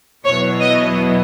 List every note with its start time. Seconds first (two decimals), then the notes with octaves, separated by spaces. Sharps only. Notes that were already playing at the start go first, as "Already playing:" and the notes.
0.24 E2 B2 F#3 B3 E4 C#5
0.60 D#5